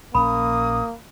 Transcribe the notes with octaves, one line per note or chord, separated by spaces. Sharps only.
A#1 A#3 C#4 B5 D#6